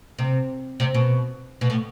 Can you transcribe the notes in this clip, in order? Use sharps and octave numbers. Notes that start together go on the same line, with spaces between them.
C3
C3
B2
B2
A2